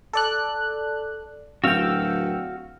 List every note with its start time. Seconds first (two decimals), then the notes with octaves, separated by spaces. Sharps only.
0.13 A4 D5 F#6
1.64 D1 F#4 F5 G5 E6